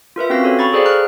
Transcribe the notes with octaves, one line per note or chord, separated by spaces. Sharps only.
F4 A#4 B4 E5
C4 C#4 F#4 G4 F5 A#6
F#4 A4 C#5
A#5 B5 C#6 A6
G#4 A4 C5 D5 F5 G5
A#5 F6 F#6